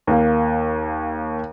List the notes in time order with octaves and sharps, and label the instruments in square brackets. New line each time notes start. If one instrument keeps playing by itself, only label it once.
[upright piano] D#2 A#3